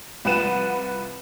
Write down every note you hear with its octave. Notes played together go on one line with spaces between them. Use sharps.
C2 F3 B4 F#5 D#7 E7